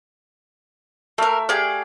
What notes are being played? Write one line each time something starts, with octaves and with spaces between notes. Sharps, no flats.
A3 A#3 A#4 E5
G4 G#4 D5 F5